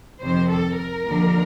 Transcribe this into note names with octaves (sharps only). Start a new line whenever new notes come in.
F2 C3 D#3 C5
A4
A#4
D#2 D3 F3